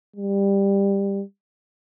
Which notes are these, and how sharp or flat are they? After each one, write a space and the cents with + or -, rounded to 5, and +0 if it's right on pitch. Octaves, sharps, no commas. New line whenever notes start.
G3 +15